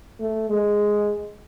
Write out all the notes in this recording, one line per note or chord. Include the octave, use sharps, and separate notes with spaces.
A3
G#3